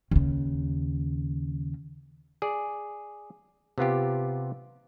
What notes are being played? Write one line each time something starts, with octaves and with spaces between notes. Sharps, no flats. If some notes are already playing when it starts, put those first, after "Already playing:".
D#2 C#3
G#4 D5
C3 B3 F4 G4